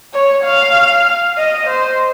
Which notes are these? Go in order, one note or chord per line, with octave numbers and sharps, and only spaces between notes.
C#5
F5
D#5
C5